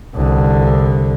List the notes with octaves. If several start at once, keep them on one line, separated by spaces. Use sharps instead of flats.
C2 D3